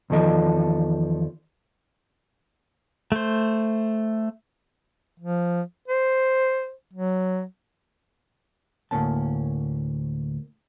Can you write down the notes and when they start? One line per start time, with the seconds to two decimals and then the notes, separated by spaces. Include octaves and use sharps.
0.10 E2 D#3 F3 A4 D#5
3.12 A3 C5
5.20 F3
5.88 C5
6.93 F#3
8.91 D2 A2 A#3 C#4 A5